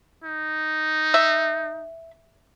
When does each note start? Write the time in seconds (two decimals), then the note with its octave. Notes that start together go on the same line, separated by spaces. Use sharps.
0.24 D#4
1.14 E5